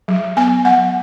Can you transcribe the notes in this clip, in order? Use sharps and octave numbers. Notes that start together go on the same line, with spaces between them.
F#3
B3 G#5
F#3 F#5